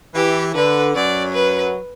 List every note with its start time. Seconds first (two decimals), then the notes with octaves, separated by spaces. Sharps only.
0.15 E3 G4
0.54 D3 B4
0.94 F#2 F#3 D5
1.33 B4